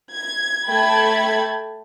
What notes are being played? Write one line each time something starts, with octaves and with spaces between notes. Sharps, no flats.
G#6
A3 G5 A5 B5 G#6